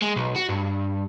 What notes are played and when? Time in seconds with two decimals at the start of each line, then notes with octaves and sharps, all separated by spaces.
0.02 G#3
0.16 B1
0.36 F#4
0.49 G2